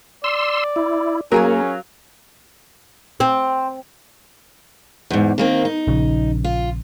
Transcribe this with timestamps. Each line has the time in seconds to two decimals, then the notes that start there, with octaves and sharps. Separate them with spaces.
0.24 D5 C6 E6
0.76 E4
1.32 F#3 A#3 C#4 F#4 G#4 A#4 F5
3.20 C4
5.10 E2 G#2
5.38 D#3 A#3 C4
5.65 D#4
5.88 A#1 C#3
6.44 F4